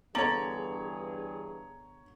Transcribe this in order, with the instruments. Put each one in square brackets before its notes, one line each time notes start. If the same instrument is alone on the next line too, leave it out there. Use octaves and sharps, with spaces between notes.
[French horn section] G2 E3 G#4 [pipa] D3 [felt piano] B3 A#5 [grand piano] C#5 F#7